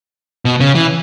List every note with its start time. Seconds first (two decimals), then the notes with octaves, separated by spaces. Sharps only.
0.45 B2
0.60 C#3
0.75 E3